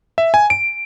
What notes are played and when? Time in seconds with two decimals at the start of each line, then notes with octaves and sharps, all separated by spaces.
0.18 E5
0.34 G#5
0.50 D7